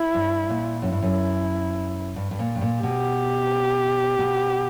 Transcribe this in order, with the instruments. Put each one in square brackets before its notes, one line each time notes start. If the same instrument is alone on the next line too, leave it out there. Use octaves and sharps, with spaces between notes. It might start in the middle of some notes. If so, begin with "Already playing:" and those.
Already playing: [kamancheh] E4
[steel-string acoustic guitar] G2
A#2
[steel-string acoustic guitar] F#2 [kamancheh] E4
[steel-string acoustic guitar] G2
F#2
G2
G2
A#2
G2
A#2
[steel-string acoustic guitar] B2 [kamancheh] G4
[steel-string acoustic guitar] B2